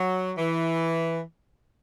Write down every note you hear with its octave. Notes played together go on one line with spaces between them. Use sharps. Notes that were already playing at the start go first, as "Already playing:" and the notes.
Already playing: F#3
E3